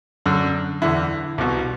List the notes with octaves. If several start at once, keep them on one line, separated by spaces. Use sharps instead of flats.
F#2 D3
E2 D3 E4
C2 B2